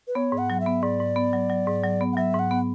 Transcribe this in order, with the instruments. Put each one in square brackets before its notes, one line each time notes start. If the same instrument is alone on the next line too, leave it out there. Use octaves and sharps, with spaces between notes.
[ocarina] B4
[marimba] B3 [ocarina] C#5
[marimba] G#2
[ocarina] F#5
[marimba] F#3
[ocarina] E5
[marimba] B3
[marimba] G#2 [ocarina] D5
[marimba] G#2
B3
F#3
F#3
G#2
F#3
B3
[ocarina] F#5
[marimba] F#3 [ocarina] E5
[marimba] G#2
[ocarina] F#5
[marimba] B3